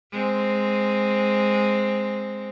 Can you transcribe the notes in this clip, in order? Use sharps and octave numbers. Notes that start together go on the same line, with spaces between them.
G#3 C4